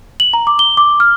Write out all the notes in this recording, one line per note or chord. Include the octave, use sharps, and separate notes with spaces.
F#7
A#5
D6
G7
D6
F6